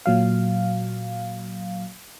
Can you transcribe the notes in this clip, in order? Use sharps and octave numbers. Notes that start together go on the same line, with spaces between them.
A#2 F#3 F5